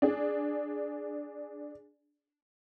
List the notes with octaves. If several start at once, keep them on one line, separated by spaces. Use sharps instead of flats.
D4 G#4